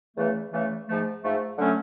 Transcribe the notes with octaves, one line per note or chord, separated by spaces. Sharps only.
E2 C#3 E3 A3
E2 C#3 E3 A3
G#2 F3 A3
G#2 F3 A3
D3 F#3 A3 C#4